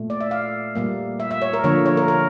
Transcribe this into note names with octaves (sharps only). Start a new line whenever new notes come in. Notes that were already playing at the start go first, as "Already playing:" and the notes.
Already playing: A#2 A3
D5
E5
F5
A#2 G3 A#3
E5
E5
C#5
A#4
D3 F3 A#3 C#5
C#5
A#4
A#4